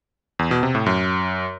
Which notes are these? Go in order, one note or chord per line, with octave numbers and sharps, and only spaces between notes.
E2
B2
C3
A2
F#2